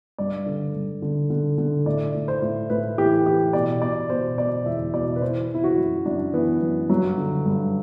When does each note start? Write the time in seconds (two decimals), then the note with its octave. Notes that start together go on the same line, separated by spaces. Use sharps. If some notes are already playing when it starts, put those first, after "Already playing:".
0.18 G2 D5
0.46 D3
0.74 G2
1.02 D3
1.30 D3
1.58 D3
1.86 A2 D5
2.14 A2
2.28 C5
2.42 A2
2.70 A2 B4
2.98 E3 G4
3.26 E3 G4
3.53 B2 D5
3.82 B2 D5
4.10 B2 C5
4.38 B2 D5
4.66 E2 E5
4.94 B2 D5
5.16 B4
5.22 E3 C5
5.50 E3 E4
5.64 F#4
5.78 F#2
6.06 F#2 D4
6.34 E3 B3
6.62 F#2
6.90 G2 F#3
7.17 D3
7.46 G2